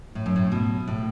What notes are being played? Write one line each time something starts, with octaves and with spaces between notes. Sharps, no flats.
A2
F#2
A2
B2
A2